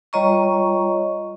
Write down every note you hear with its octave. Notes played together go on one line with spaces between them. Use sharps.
G3 F4 C#5 D#5 A#5 C#6